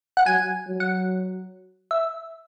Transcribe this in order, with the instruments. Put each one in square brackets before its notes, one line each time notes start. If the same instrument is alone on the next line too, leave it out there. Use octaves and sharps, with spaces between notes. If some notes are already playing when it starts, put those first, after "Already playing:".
[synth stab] F#5
[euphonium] F#3 [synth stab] G#5
[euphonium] F#3
[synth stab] F#5
E5